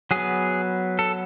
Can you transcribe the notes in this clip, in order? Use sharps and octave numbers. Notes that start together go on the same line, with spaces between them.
F#3 B3 G#4
A4